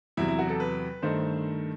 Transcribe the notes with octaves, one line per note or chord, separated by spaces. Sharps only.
E2 C3 F#3 E4
E4
F#4
A4
B4
G2 D#3 A3 C5